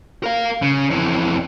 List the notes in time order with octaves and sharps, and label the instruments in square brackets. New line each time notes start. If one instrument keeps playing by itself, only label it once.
[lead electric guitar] A#4 F5
C#3
F2 E3